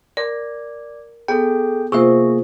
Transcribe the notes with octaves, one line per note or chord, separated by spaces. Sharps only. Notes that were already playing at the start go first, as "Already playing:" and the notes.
A#4 D5
B3 G#4 A4 G5
C3 A#3 F4 G#4 C5 E5 C#6